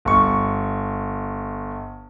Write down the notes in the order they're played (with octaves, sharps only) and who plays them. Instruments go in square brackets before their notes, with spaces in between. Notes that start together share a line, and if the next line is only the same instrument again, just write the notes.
[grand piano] G1 C#6